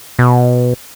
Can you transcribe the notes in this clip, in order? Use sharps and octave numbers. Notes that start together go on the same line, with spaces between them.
B2